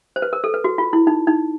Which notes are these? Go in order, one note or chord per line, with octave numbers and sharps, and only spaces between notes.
C5
B4
A#4
A4
B4
F#4
F4
E4
D#4
D#4